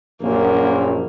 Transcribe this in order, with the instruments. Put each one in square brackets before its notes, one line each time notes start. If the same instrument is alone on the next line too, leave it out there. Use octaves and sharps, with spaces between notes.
[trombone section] A#1 F#2 [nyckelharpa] A#3